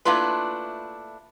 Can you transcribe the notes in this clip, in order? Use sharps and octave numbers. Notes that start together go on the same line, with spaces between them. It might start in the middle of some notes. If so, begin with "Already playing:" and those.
A3 A#3 D4 E4 F4 B4